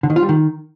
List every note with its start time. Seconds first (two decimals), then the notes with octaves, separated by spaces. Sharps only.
0.03 D3
0.10 D#3
0.16 F4
0.22 G3
0.29 D#3